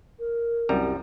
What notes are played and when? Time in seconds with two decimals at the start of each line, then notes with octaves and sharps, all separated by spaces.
0.19 A#4
0.69 C2 F#2 G3 A#5